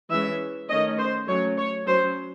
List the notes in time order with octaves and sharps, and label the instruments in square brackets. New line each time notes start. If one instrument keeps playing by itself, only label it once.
[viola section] E3 G#3 C#4 E5
D#3 A3 C#4 D#5
C5
F#3 A3 C#4 C#5
C#5
F#3 C#4 C5